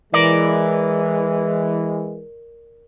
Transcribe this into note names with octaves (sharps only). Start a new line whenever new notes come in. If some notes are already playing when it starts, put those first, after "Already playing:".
E3 G#3 A#4 D5